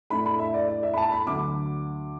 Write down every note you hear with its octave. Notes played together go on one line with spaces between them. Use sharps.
A2 A3 D4 B5
B5
E5
D5
D5
E5
B5
A5
B5
D2 D3 F#3 D6